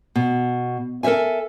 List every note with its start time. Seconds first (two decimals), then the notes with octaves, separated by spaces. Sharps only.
0.16 B2
1.03 A4 A#4 C#5 E5 G#5